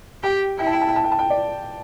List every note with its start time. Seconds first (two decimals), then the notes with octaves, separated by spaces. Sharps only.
0.23 G4 G5
0.59 E4 G5
0.66 A5
0.74 G5
0.81 A5
0.88 G5
0.96 A5
1.04 G5
1.12 A5
1.19 G5
1.30 D5